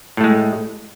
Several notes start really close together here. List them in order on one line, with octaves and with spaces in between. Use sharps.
A2 A3 G#3